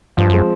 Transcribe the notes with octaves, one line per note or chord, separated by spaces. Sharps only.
G2 F3
F#2 G#3 C4